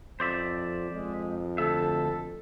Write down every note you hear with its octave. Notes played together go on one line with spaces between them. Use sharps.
F2 C5 D5 E5
F2 G#3
D2 A4 E5